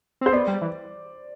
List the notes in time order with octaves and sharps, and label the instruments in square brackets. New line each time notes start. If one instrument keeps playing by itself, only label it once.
[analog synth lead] C4 [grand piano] C5
[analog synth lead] B3 [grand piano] D5
[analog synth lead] G3
E3